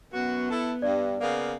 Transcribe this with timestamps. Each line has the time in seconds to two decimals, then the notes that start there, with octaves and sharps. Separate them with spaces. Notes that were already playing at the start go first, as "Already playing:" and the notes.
0.12 F#2 B3 F#4
0.50 E4 A4
0.82 G2 D5
1.21 C#3 A#3 B3